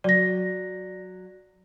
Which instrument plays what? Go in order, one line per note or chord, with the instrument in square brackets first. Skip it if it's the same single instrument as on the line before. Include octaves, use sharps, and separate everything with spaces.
[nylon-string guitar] F#3 [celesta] D5 A#6